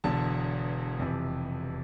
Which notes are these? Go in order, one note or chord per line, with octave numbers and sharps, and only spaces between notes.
E1 E2 D3 A5
F1 F2 C3 E3